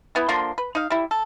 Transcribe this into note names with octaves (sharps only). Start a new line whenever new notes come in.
E3 B3 E4
D3 F3 A#3 C6
B4
D#4 F5
G3 E4
A4